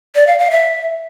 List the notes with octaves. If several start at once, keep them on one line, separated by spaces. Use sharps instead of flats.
D5
F5
F5
E5